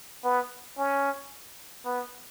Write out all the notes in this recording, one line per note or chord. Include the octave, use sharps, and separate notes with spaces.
B3
C#4
B3